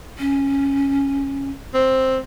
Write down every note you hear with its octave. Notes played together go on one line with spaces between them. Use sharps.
C#4
C4